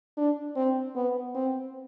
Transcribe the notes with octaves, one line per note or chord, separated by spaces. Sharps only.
D4
C4
B3
C4